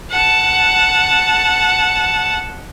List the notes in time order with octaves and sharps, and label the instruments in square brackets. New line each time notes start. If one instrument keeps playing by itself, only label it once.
[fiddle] F#5 A5